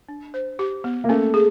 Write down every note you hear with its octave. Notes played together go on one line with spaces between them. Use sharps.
D4
C5
G4
B3
A#3
A3 C#4
G#4